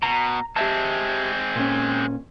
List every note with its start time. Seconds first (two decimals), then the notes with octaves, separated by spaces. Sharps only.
0.03 B2 A#5
0.56 G#3 C4 G4 E5 A5
1.56 A#2 C#4